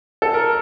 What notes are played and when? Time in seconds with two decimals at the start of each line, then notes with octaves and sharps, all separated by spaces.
0.22 A4
0.34 A#4